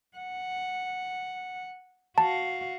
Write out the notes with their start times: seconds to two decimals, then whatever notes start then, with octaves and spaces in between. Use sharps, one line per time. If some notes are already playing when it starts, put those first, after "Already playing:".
0.17 F#5
2.18 F#4 F5 A5